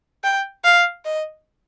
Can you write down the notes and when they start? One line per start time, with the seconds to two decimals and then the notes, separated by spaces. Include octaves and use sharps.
0.24 G5
0.65 F5
1.05 D#5